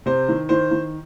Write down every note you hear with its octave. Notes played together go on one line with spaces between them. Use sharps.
C3 C5
D#3
D#3 C5
D#3